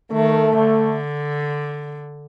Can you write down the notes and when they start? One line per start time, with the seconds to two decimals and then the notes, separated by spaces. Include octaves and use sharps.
0.11 D#3 A3
0.59 D3